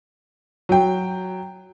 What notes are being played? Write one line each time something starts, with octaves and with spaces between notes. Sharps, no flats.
F#3 G5